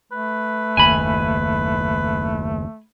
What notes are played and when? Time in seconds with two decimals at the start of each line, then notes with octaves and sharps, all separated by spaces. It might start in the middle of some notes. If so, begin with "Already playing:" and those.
0.12 A3 B4
0.77 F#1 D#2 G#5 B5